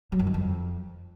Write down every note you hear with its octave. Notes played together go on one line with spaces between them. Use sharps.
F#3
F#2
D#3
F2